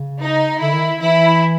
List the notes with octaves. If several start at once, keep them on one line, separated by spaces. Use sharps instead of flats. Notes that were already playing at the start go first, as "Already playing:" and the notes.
Already playing: C#3
D#4
D3 E4
D#3
E3 E4